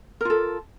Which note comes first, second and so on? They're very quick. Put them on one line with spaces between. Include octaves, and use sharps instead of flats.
A#4 F4 A4